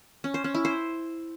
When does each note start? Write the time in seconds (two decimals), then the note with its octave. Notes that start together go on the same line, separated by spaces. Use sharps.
0.24 C#4
0.34 C5
0.44 C#4
0.54 E4
0.65 C5